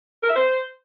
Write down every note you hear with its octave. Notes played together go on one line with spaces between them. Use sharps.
A#4
E5
C5